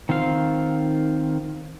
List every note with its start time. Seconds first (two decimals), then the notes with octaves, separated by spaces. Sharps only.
0.09 D#3 C4 F4 F5